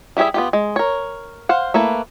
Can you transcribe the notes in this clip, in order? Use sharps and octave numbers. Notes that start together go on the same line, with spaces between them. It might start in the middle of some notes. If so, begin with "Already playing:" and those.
G3 E4 G4 G#4 E5
B3 F4 G4
G#3
A#4 C#5
C5 F5 F#5
A3 A#3 E4 B4